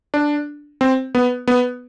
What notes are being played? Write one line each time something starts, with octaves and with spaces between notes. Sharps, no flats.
D4
C4
B3
B3